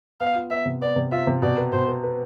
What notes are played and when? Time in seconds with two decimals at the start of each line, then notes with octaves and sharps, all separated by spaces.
0.20 B3 F5
0.35 F4
0.50 B3 E5
0.66 C3
0.81 B3 D5
0.96 C3
1.12 F4 E5
1.27 C3
1.42 B2 D5
1.58 B4
1.72 B2 C5
1.88 B4
2.03 B4